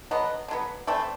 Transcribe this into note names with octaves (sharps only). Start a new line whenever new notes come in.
D3 F#3 B3 D#5
D3 F#3 B3
E3 A3 C4 D5